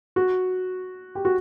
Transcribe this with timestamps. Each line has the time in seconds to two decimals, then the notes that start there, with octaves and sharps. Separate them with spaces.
0.16 F#4
1.15 G4
1.25 F#4